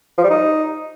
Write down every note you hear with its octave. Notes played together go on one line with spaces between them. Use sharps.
F3
G3
D#4